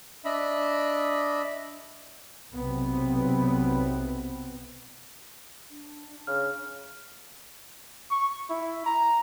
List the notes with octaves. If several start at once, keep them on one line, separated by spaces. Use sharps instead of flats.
D4 D#5 E5 B5
B1 C3 B3 C4
D4
C#3 F6
C#6
E4
A#5